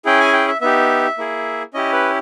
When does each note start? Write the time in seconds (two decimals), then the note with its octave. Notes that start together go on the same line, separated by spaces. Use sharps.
0.05 C#4 E4 G#4 G5
0.20 G#5
0.33 G5
0.48 E5
0.61 B3 D#4 G4 E5
1.18 A#3 E4 G#4
1.74 C#4 E4 G4 D#5
1.93 B4